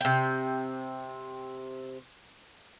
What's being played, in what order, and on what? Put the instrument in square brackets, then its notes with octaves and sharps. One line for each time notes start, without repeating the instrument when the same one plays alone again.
[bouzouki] C3 G5